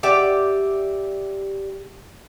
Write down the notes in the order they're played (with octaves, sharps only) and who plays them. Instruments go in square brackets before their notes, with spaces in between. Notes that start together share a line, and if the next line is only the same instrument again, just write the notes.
[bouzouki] G4 D5 E5 F#5